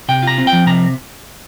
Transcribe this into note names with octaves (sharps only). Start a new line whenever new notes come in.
C3 G5
F4 A#5
C4
G5
F3
C3 A#5